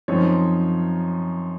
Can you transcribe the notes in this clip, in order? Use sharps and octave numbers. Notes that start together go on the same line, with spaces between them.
F#2 F3 C4 D#4 C#5